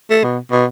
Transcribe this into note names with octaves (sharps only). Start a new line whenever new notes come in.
A3
B2
B2